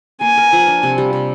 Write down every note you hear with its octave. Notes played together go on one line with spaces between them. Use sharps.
A#3 G#5
A#4
F3
D4
C3
G3
C3